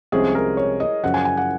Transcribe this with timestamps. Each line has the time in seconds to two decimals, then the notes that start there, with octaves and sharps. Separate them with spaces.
0.12 C2 C3 F3 G#3 C#4 G#4
0.35 A#4
0.57 C#5
0.80 D#5
1.04 F#2 C#3 F3 F#5
1.14 G#5
1.25 G#5
1.37 F#5